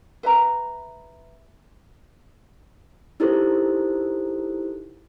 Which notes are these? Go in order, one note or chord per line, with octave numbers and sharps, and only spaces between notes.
B4 E5 A#5
D#4 E4 G4 A4 A#4 C5